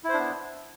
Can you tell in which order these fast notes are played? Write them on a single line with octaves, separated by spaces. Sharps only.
E4 C5 D4 B3